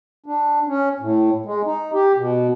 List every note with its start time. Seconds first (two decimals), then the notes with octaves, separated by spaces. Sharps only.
0.26 D4
0.68 C#4
1.00 A2
1.46 G#3
1.66 D#4
1.94 G4
2.17 B2